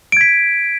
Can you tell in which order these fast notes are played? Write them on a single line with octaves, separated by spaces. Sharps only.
D7 G#6 B6